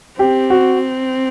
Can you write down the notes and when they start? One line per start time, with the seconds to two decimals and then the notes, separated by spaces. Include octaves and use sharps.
0.19 C4 G4
0.50 F#4